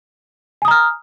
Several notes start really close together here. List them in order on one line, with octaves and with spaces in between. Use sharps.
G#5 D#6 A#5 F6